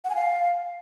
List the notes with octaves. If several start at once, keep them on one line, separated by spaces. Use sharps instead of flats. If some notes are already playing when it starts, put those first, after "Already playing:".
F#5
G#5
F5